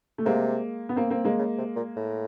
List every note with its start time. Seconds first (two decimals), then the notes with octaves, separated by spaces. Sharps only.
0.18 A3
0.25 C3 G#3 A#3
0.89 B3
0.96 A#3 C4
1.10 A#3 C4
1.24 G#3 A#3
1.39 C#3
1.58 C3
1.76 A#2
1.96 A2